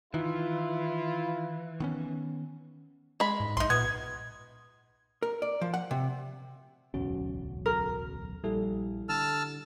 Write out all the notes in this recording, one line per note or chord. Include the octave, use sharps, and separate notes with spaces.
D#3 E3 E4 F4
D#3 B3 C#4
G#3 B5
G#2
B1 D#4 C6
A#2 B3 G#6
A#4
D5
F3
F#5
C3
D1 B1 E2 C#4 F#4
A#4
A#1 G3 E4 A4
D3 A5 E6 F6